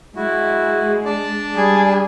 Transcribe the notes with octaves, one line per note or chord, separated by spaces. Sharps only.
G#3 E4 F#4
D4 D5 A5
G3 G#4